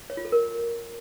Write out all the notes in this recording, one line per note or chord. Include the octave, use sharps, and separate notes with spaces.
C#5
F4
A4
A#4